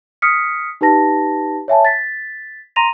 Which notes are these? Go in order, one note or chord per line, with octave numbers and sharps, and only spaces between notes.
D#6 F6 B6 C#7
D#4 G4 B4 A5 A#6
C#5 E5 G#5 A5
A6 B6
A#5 C6 A#6 D#7 F7